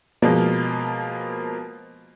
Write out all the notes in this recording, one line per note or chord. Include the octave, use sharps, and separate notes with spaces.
B2 F3 G#3 A#3